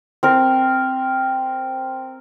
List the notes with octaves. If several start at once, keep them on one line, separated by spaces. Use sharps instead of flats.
C4 A#4